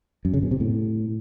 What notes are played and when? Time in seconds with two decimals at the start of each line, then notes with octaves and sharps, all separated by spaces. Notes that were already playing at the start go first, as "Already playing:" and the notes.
0.25 F#2
0.34 C#3
0.42 B2
0.51 C3
0.60 A2